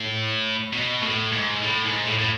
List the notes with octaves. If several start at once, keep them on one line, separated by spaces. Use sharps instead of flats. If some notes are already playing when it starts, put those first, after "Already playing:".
Already playing: A2
B2
A2
G#2
A2
G#2
A2
A2